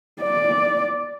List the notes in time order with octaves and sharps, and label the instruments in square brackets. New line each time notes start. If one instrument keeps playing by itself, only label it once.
[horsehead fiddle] D5